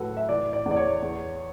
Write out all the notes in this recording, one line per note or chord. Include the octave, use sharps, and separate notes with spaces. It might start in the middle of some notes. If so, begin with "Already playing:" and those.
Already playing: A2 F#3 F#4 A4 B4
E5
E3 D5
D5
E2
D5
C#5
E2